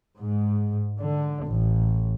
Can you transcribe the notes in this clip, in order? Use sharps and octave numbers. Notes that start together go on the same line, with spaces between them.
G#2
D3
A1